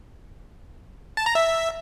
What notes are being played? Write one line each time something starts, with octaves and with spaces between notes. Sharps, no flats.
A5
A#5
E5